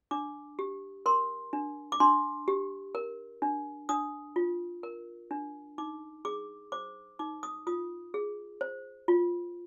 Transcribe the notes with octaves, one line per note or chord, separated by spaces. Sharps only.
D4 D6
G4
A#4 C6
D4
D6
D4 C6
G4
A#4
D4
D4 D#6
F4
A#4
D4
D#4 D6
G#4 D6
C5 D6
D#4 D6
D#6
F4 D#6
G#4
C5
F4